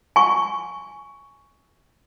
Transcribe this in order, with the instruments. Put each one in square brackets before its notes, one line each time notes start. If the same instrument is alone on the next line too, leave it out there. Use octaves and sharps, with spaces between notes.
[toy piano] G#5 C#6